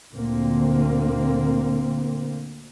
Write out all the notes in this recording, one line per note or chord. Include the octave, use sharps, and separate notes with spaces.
D2 A#2 D3 A#3 C4